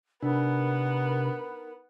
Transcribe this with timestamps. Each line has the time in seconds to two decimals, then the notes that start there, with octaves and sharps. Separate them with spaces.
0.22 C3 B3 D4 D#4 A#4 B5